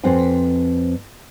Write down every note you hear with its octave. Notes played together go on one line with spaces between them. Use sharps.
F2 C4 F#4 B4 C5 G#5